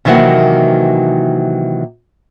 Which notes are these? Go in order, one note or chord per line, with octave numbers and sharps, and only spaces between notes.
C3 D#3 E3 F#3 A#3 F#5